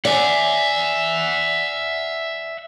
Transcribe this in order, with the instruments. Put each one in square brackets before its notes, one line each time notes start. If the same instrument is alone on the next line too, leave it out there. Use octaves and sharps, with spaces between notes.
[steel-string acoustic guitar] D5 G#5 [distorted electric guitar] E5 F#5